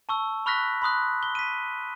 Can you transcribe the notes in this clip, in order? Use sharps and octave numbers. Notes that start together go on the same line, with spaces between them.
A5 C#6 E6
B5 C#6 F6 F#6 A#6 B6
B5 C6 D#6 F#6
G7
B6 D#7